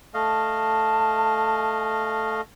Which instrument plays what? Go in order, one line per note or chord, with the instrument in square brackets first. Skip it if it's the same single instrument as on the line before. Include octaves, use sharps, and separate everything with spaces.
[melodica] A3 D#5 F5 [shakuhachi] A5